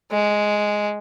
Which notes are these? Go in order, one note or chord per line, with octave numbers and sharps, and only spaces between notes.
G#3